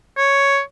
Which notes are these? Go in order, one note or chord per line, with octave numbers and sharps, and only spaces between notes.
C#5